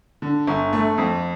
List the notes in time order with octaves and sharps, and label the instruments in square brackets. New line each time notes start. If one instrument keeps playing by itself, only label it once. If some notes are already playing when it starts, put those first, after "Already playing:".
[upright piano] D3
G1
A3
F2